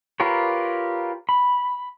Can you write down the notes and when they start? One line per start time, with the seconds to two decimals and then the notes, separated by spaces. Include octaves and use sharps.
0.20 F4 G4 A#4 B4 C#5
1.29 B5